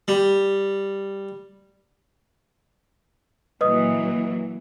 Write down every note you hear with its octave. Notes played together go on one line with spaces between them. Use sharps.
G3
A#2 E3 F#3 B4 D#5 D#6